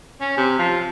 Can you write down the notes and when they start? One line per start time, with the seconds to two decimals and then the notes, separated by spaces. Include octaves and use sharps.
0.20 C#4
0.37 C3
0.59 F3